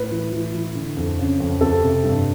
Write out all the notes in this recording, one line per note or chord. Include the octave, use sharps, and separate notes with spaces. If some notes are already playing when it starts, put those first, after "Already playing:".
Already playing: A2 B4
E3
E3
E3
D3
F2
C#3
F2
F2 A4
C3
G2